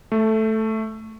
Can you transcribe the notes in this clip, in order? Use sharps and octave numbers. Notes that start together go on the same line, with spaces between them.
A3